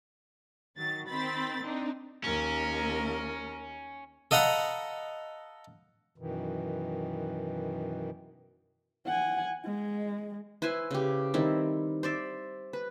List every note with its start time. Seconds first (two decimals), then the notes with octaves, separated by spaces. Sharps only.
0.78 D#3 F#3 A6
1.08 D#3 C4 B5 A6
1.62 C4 D4 D#4
2.24 D#2 C#4 A#4
4.31 A4 D#5 F5 F#5 A#5 B5
6.18 F#2 B2 D#3 E3
9.06 F#5 G#5
9.65 G#3
10.62 E4 B4 C5 G#5
10.91 C#3 G4
11.34 D#3 G3 C4 E4
12.03 C5 D5 E5
12.73 B4